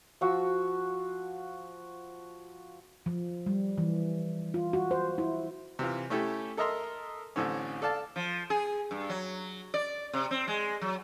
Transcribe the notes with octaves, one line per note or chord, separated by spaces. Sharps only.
F3 F#4 E6
F3
G3
E3
F4
F#4
C5
E4
C3 E3 F4
A3 C#4 E4 G4 A4
A4 A#4 D#5 E5 A#5 C6
A1 A2 D3 C4 C#4
A4 D5 F5 A5
F3
G#4
G2
F#3
D5
C3
C4
G#3
F#3